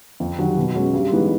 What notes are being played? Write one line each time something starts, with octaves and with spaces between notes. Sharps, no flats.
F2
C3 D#3 F#3
B2
G#3 C#4 F#4
G2
E3 G#3 B3 D#4